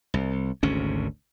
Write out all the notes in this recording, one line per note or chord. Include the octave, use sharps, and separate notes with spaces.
C2
G#1 D2 C3 C#4